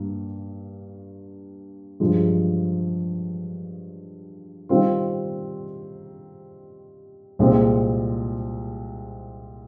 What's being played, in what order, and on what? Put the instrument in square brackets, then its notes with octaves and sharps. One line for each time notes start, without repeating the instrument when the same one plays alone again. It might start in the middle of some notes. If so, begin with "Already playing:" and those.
Already playing: [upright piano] G2 A#3
G2 F3 G#3
D#3 G3 C4 F4
C2 A#2 G#3 C4